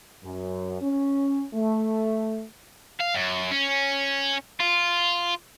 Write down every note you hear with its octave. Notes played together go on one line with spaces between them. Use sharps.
F#2
C#4
A3
F5
F#2
C#4
F4